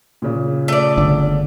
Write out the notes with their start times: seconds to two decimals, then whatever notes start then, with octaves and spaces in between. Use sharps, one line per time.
0.22 A#2 C#3
0.68 A3 D5
0.97 G1 D3